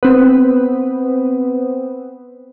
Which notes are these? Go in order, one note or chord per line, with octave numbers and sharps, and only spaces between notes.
B3 C4